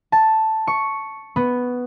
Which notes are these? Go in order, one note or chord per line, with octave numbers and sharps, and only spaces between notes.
A5
C#6
B3